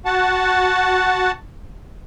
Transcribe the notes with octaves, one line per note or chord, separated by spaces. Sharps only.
F#4 F#5 A5